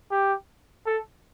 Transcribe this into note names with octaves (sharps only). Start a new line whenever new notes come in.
G4
A4